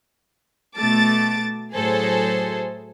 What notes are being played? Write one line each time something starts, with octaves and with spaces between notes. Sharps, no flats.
B2 A3 A5 D6 A6
A2 F#3 G#4 A4 C5